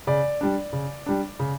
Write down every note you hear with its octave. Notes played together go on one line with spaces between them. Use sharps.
C#3 D5
G3 D4
C#3
G3 D4
C#3